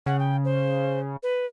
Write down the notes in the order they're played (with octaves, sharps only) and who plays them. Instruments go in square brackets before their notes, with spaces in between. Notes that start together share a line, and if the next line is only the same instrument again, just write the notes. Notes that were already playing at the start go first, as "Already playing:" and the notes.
[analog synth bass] C#3 [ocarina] F#5
[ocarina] G5
C5
B4